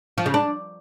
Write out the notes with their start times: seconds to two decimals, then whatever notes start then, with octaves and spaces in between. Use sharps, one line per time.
0.18 F3
0.26 C#3
0.34 D4